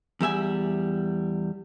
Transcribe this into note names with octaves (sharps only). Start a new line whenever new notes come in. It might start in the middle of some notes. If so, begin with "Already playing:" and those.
E2 G3 E5 G#5